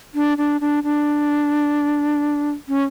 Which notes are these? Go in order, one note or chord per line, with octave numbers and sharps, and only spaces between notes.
D4
D4
D4
D4
C#4